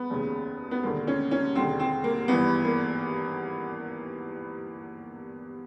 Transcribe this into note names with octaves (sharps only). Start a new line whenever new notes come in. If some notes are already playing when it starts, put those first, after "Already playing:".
Already playing: B3
F1 D#2 C#3
B3
E1 D#2 D3 A#3
C#4
C#4
E1 D#2 D3 C4
C4
A#3
G#1 G2 E3 B3
A#3